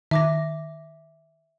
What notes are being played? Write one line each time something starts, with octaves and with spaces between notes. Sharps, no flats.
D#3 E5 D6 A#6